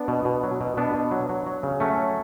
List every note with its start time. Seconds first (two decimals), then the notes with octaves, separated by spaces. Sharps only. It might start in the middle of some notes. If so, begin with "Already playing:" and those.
Already playing: B3 D4
0.08 B2
0.25 B2
0.43 F#3
0.61 B2
0.77 B2 B3 D4
0.94 B2
1.11 F#3
1.29 F#3
1.47 F#3
1.63 C#3
1.80 F#3 A3 C#4
1.98 F#3